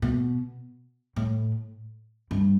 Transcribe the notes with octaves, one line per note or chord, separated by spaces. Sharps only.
B2
A2
G2